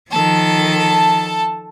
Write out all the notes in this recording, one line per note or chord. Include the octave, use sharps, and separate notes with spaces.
D#3 F3 A4 A5